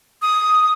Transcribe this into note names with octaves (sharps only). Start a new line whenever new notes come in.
D#6